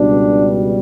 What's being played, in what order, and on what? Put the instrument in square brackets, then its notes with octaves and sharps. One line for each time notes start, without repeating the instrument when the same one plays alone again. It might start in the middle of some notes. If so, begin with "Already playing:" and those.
Already playing: [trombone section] C#2 B2 G3 D4